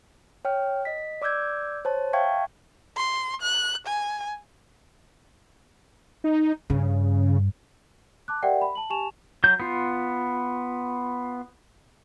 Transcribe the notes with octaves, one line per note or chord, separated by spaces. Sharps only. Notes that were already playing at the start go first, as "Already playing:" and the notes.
C#5 G5 F6
D#5 B6
D5 D6 E6 G6 G#6
C5 C#5 A5
E5 F5 G5 A5 C#6 G#6
C6
F#6
G#5
D#4
G2 C#3
A5 D6 F#6
G4 A#4 D5 E5 F#5 G5
B5
A5 F#7
G4 G#5 A5 C#6 E7 F7
F#3 G6
B3 F4